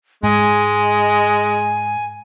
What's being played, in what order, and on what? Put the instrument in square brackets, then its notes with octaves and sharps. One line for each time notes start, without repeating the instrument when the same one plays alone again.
[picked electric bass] G#2 [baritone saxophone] G#3 [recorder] G#5